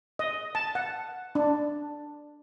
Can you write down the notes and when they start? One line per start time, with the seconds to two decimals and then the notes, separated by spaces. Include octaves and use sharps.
0.19 D#5
0.55 A5
0.75 F#5
1.35 D4